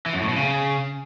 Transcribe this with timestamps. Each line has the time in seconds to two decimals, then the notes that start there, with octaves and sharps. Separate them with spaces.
0.06 E3
0.14 F#2
0.21 A2
0.29 B2
0.36 C#3